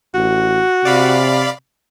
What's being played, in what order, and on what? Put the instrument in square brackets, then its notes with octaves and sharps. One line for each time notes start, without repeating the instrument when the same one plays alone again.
[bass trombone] A1 [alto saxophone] F#4
[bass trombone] C3 [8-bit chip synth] D5 F5 B5